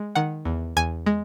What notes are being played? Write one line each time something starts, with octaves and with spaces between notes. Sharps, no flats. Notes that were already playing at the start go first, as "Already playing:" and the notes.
Already playing: G#3
D#3 F#5
E2
E2 G#5
G#3